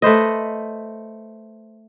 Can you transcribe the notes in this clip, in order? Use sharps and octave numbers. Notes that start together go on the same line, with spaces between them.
A3 B4 C5 D#5